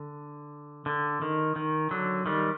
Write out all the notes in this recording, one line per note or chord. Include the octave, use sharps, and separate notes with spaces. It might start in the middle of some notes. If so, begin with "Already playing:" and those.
Already playing: D3
D3
D#3
D#3
D3 F#3
D#3 G3